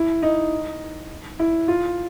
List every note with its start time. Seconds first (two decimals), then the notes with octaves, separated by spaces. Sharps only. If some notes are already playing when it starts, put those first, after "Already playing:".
Already playing: E4
0.22 D#4
1.39 E4
1.68 F4